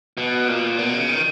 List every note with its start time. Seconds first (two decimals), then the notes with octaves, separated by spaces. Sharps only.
0.17 B2
0.48 A#2
0.78 B2
0.93 C#3
1.09 D#3